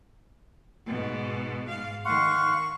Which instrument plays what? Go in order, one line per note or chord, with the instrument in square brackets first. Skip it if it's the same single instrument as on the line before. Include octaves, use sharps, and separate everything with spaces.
[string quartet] G#2 B2
G#2 F5
[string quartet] D#3 [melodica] F5 F#5 C6 [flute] C#6